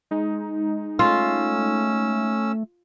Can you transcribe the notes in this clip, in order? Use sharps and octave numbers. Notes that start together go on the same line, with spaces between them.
G#3 D#4
A3 C#4 F4 E6